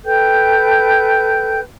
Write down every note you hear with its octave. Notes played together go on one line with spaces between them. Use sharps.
A4 B4 G5 G6